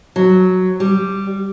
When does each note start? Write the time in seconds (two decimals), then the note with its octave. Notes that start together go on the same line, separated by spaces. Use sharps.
0.16 F#3
0.80 G3